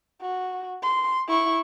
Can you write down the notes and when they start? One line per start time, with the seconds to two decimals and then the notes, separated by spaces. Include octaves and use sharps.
0.22 F#4
0.83 C6
1.28 E4 C#6